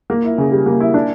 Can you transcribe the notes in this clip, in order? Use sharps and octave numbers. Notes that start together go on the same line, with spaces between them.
A#3
E4
C#3
G3
A#3
E4
D4